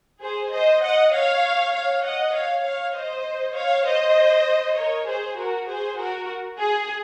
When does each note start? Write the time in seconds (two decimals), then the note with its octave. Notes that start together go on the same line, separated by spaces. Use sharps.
0.21 G#4 C5
0.52 C5 D#5
0.82 D#5 F#5
1.12 C#5 F5
1.73 C#5 F5
2.03 D#5 F#5
2.33 C#5 F5
2.64 C#5 F5
2.95 C5 D#5
3.55 C#5 F5
3.85 C5 D#5
4.77 A#4 C#5
5.07 G#4 C5
5.37 F#4 A#4
5.68 G#4 C5
5.97 F#4 A#4
6.59 G#4